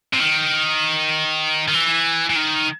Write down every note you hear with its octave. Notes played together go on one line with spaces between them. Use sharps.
C3
D#3
D#3
E3
E3
D#3